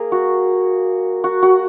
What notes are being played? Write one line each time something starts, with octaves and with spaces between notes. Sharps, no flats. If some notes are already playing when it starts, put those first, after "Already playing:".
Already playing: A#3 G#4 A#4
F#4
F#4
F#4